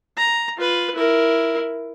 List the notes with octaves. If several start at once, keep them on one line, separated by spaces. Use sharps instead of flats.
A#5
F4 B4
E4 A#4